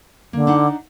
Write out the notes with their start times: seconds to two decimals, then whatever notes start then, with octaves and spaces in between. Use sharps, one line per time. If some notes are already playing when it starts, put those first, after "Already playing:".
0.33 D3 A#3
0.47 D4 D#4 F#5